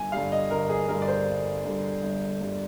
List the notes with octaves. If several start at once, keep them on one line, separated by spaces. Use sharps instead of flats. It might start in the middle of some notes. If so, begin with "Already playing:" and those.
Already playing: G1 G#5
G2 D3 G3 F5
D#5
G1 A#4
G#4
G2 D3 G3 A#4
D5
C5
G1
G2 D3 G3
G1
G2 D3 G3